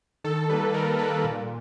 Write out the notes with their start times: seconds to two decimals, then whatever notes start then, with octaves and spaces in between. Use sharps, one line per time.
0.24 D#3 A4
0.49 G3 A#3 B4
0.74 D#3 A#4
0.99 G3 A#3 B4
1.24 A#2